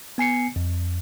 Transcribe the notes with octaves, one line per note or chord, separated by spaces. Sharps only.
B3 G#5 C7 C#7
F2